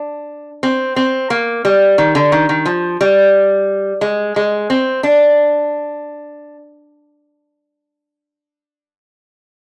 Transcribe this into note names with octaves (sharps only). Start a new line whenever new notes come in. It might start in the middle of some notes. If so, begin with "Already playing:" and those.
Already playing: D4
C4
C4
A#3
G3
D#3
D3
D#3
D#3
F3
G3
G#3
G#3
C4
D4